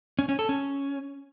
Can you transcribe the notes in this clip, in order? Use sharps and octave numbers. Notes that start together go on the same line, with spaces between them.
C#4
C#4
A4
C#4